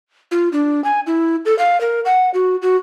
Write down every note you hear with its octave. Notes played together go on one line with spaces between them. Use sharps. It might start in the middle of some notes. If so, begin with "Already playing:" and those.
F4
D4
G#5
E4
A4
F5
A#4
F#5
F#4
F#4